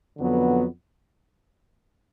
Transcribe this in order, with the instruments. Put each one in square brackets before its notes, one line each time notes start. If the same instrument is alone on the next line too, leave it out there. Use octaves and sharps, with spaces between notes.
[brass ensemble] F2 D3 F#3 B3